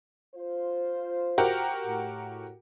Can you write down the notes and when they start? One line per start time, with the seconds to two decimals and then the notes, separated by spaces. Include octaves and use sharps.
0.35 F4 C5
1.38 F#4 G4 A#4
1.86 A2